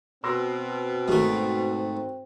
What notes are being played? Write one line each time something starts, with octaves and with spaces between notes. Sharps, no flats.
B2 C4 C6 E6 A#6
G#2 A3 F#4 A#4